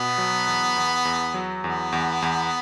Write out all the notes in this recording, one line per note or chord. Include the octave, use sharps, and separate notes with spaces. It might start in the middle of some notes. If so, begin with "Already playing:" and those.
Already playing: B2 B3
F#3
E2
E2
E2
F#3
E2 B3
E2
E2